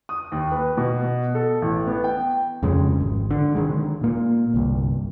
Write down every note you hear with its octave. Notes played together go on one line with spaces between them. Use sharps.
D#6
D#2
B4
B2
A4
A1
B3
G5
F2 C#3 G#3
G#1
D3
D#3 E3 G#3
A#2 A#3
G1 C2